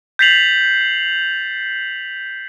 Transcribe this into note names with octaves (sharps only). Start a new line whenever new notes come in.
G6 A6 B6 C7 F7 F#7